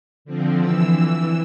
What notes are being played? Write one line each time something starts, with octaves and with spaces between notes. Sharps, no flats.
D3 F3 C4
E3 E6